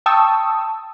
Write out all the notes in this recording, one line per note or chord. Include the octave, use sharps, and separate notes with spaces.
G5 A5 C#6 D#6 E6